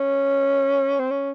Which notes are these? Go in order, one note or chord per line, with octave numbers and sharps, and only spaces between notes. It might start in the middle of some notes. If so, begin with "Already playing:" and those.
Already playing: C#4
C4
C#4